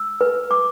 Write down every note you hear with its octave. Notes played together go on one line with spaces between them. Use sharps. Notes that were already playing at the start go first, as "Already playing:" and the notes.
Already playing: E6
B4
D6